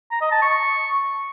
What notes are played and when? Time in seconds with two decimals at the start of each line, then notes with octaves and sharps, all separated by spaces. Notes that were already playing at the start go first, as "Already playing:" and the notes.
0.12 A#5
0.22 D#5
0.32 A5
0.42 C#6